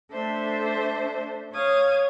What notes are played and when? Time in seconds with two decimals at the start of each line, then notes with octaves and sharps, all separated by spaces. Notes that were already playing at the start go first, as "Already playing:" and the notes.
0.12 A3 D4 A4 C5 E5
1.54 C#5 F5 D#6 G#6